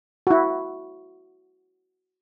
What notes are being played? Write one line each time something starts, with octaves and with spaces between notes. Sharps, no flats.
E4 F#4